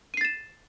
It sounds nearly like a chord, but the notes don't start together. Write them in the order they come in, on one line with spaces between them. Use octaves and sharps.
D#7 C7 A6 E7